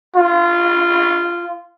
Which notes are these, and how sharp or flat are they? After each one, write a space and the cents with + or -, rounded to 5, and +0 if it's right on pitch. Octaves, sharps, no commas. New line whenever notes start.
F4 -15